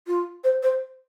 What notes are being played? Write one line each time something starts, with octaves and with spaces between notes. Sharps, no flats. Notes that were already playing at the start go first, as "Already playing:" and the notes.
F4
C5
C5